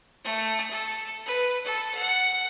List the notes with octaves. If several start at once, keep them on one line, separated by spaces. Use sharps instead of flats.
A3
A4
B4
A4
F#5